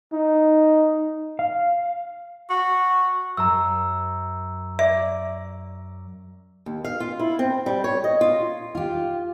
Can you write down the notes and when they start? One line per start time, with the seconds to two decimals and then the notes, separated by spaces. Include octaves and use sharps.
0.13 D#4
1.39 F5
2.50 F#4
3.37 F#2 A#5 E6
4.79 D5 E5
6.66 D#2
6.85 F5
7.00 F4
7.19 E4
7.39 C4
7.66 G3
7.84 C#5
8.04 D#5
8.21 F4
8.75 F4 G4